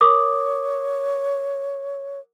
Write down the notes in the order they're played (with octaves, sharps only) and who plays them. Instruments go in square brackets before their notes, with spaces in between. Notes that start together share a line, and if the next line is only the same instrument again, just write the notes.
[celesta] A#4 D6 D#6 [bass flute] C#5